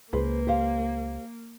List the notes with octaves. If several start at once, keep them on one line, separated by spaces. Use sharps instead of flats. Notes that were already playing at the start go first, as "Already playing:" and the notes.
C#2 A#3 G#4 B4 C5
G4 C5 F5